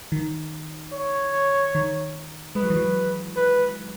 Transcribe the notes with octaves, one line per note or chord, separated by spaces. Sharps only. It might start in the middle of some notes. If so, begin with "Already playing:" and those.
D#3
C#5
D#3
G#3 B4
F#3
E3
F#3
B4